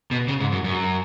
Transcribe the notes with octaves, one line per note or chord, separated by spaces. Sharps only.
B2
C#3
G#2
F#2
F#2